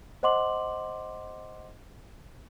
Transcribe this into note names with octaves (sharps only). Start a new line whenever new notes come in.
C5 D#5 F#5 C6 D6 F#7